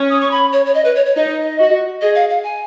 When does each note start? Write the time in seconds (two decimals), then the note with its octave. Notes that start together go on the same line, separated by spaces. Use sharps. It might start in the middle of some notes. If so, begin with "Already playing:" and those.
Already playing: C#4
0.10 D#6
0.21 C#6
0.31 B5
0.52 C#5
0.66 C#5
0.74 D#5
0.85 B4
0.96 C#5
1.06 C#5
1.16 D#4 D#5
1.59 F#4
2.01 G#4 D#5
2.15 F5
2.30 F5
2.44 G#5